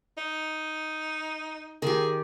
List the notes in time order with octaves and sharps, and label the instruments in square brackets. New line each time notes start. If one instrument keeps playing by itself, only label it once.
[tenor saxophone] D#4
[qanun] D#3 G4 [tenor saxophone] G#4